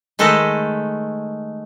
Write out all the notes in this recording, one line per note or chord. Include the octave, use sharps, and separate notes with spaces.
D#3 G#3 A3 A4 B4 D#5